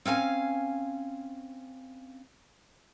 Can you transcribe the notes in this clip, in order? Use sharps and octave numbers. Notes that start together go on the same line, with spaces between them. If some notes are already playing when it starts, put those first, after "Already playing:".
C4 C#4 F5 G#5